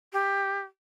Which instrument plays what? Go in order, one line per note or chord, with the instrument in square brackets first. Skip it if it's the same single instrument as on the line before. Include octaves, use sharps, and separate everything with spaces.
[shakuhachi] G4